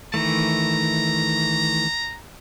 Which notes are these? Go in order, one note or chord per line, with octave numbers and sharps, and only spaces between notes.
D#3 E3 A3 A#5